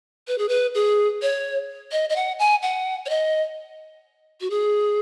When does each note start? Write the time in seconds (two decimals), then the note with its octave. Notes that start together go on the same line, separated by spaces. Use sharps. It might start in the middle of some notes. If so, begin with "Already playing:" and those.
0.28 B4
0.38 G#4
0.49 B4
0.75 G#4
1.22 C#5
1.92 D#5
2.09 D#5
2.16 F#5
2.39 G#5
2.62 F#5
3.06 C#5
3.10 D#5
4.41 F#4
4.50 G#4